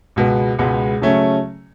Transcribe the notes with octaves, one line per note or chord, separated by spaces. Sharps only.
C#2 B2 G#3 B3
C#2 B2 G#3 B3
C#3 F#3 A3 C#4